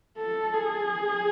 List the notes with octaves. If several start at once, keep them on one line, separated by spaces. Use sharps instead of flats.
A4
G#4